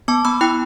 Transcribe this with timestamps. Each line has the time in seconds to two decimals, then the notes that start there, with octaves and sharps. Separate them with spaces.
0.08 B3 A5 D6
0.25 B3 B5 E6
0.41 E4 G5 B5